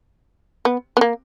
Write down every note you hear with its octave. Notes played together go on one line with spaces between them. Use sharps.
B3
B3
A#3